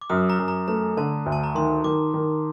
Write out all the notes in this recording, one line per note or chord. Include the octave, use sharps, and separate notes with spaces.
D6
F#2 D#6
A#5
F#2
A#5
A3 A#5
D3 A5
D2
A5
A#5
D#3 C6
D#3 D6
D#3